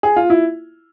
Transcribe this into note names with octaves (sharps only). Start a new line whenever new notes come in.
G#4
F4
E4